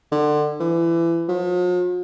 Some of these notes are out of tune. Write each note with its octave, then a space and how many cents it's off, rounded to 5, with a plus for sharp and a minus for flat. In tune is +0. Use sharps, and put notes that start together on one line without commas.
D3 +30
E3 +25
F3 +45